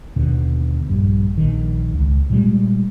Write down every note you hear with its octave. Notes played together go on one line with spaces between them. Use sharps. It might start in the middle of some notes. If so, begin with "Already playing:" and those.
D#2 B2 D3
A#1 G2
A#1 D#3
C#2
A#2 G3 G#3